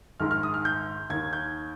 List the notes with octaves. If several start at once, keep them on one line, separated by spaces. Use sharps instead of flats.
A#1 G#2 D#3 F6
F6
D#6
F6
G6
D#2 D#3 G#6
G6